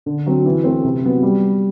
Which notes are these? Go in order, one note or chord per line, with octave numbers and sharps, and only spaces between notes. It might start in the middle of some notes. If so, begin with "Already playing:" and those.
D3
F#3 C4
E3
A3 C4
C3
F#3 B3
G3